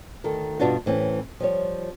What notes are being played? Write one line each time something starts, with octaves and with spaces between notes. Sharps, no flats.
D2 D#3 A4 A#4
G2 B2 B3 D4 F4 F#4
A2 E3 C4 C#4
F3 G3 C#5